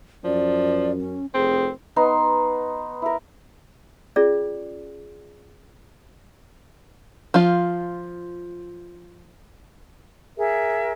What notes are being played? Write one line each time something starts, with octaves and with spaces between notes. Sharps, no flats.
F#2 F3 D5
C#4
F1 C4 G#4
B3 D#4 C6
E4 A#4
C#4 F4 G#4 D5
F3 F4
G#4 A#4 E5